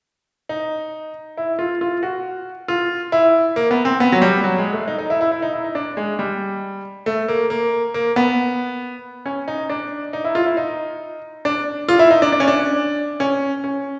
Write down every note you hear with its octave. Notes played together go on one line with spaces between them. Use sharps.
D#4
E4
F4
F4
F#4
F4
E4
A#3
B3
C4
B3
F#3
G3
F#3
G#3
A3
D#4
D#4
E4
E4
E4
D#4
E4
D#4
D4
G#3
G3
A3
A#3
A#3
A#3
B3
C#4
D#4
D4
D#4
E4
F4
E4
D#4
D4
F4
E4
D#4
D4
D4
C#4
D4
C#4
C#4